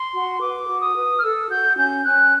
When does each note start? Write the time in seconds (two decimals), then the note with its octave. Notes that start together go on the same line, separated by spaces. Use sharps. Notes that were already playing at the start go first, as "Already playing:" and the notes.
Already playing: C6
0.13 F#4
0.40 B4 D6
0.68 F#4
0.82 D#6
0.96 B4
1.17 F6
1.23 A4 E6
1.50 F#4 G6
1.77 C#4 G6
2.05 C#4 F#6